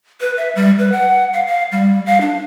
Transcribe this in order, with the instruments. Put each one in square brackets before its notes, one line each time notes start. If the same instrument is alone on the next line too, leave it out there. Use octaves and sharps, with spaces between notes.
[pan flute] B4
E5
G3
B4
F#5
F5
F5
G3
F5
D4